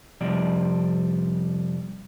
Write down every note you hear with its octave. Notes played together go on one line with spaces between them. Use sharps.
F2 C3 F3 G3 D5